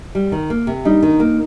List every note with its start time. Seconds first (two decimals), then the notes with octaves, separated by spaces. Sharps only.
0.15 G3
0.32 D#3
0.50 A#3
0.67 C3
0.85 G3 D#4
1.03 D#3
1.20 A#3